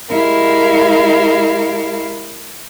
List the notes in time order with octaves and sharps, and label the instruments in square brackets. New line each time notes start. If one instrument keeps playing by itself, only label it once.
[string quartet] G#3 E4 G4 A#4 F5